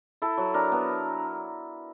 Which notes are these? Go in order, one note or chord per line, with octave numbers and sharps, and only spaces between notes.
E4 A4
F#3
D4 A#4
B3